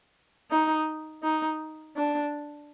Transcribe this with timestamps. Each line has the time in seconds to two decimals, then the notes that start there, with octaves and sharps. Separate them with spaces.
0.51 D#4
1.23 D#4
1.97 D4